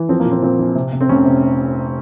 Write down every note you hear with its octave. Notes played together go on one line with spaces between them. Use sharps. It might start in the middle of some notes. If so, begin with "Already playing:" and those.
Already playing: E3
F3 C4
A#3
A#2
C4
A#2 C4
A#1
C3
C3
C4
F1 C#4
C3